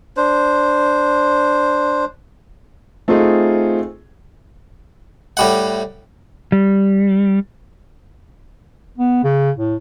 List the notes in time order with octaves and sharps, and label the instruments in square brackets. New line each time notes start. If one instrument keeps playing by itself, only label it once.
[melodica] D4 C5
[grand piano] A3 C4 D#4 F4 G#4
[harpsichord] A2 G3 F#5
[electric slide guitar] G3
[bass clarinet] B3
C#3
A2